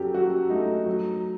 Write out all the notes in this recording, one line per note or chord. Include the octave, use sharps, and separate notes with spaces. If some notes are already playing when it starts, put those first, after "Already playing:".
Already playing: F#2 F#3 G4 A4
F#3 F#4
A3 D#4
F#3